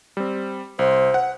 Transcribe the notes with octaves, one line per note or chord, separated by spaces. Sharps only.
G3 C4
C2 C5
F#5